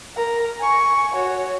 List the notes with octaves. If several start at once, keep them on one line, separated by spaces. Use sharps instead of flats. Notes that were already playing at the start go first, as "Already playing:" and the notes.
A#4 A#5
G#5 C#6
F#4 C#5